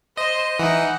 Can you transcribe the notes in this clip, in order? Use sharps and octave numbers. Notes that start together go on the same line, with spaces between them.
C5 D#5
E3 D#4 F#5